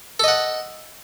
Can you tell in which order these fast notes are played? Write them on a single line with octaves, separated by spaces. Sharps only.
A4 D#5 F#5